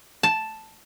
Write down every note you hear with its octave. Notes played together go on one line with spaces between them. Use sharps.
A5